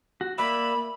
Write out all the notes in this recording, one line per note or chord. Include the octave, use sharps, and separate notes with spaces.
F#4
A#3 D5 E5 B5